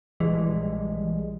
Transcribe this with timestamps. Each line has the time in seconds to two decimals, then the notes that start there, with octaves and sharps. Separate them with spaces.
0.20 A#1 E3 G3 G#3